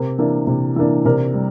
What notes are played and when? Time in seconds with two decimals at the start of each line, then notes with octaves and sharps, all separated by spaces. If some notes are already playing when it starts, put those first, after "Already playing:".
Already playing: C3 A#4
0.19 E3 A#3 D4
0.47 C3
0.76 E3 A#3 D4
1.05 C3 A#4 D5
1.34 G3